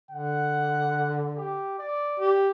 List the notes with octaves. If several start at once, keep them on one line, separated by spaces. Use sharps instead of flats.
D3 F#5
G4
D5
G4